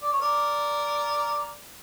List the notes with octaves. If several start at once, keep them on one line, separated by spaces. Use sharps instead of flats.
D5
C#5
A#4 D5